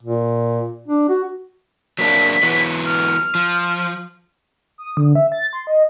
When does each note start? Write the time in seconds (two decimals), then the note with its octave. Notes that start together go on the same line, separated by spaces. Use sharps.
0.03 A#2
0.88 D4
1.09 F#4
1.99 F#3 A#3 D4 B6
2.43 E3 F#3 B3
2.86 F6
3.35 F3
4.78 D#6
4.97 D3
5.15 E5
5.32 A6
5.53 C6
5.67 D#5